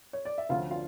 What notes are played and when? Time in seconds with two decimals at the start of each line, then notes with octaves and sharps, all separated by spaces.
0.13 C#5
0.25 D5
0.38 E5
0.49 D2 D3 F3 C#4 F4 F5
0.71 F4 F5